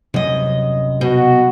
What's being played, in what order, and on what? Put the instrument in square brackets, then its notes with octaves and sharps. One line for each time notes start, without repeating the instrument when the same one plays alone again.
[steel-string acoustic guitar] F#2 D#5 [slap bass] C3 F#3 G3
[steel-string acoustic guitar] B2 [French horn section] F#4